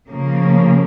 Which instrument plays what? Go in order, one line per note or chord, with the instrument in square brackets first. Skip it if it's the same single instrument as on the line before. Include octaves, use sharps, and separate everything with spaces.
[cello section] C#3 F3 A#3